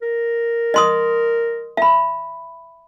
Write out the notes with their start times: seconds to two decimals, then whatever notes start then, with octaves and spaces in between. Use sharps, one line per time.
0.02 A#4
0.74 D#5 C6 D#6
1.77 E5 B5